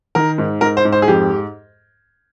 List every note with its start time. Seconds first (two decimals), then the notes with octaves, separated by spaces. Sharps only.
0.15 D#3 A#4
0.38 G#2
0.61 G#2 A#4
0.77 C5
0.85 G#2
0.92 C5
1.02 G#4
1.08 F2 G4